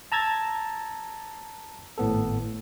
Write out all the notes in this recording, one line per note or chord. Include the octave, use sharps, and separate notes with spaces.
A5 A#5 E6 G#6 A6
G#1 A2 B3 A4